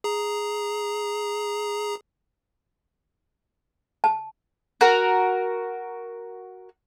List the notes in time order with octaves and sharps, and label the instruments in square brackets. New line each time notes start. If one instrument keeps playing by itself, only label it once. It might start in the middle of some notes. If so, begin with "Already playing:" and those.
[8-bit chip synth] G#4 A#5
[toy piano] A5
[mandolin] F#4 A#4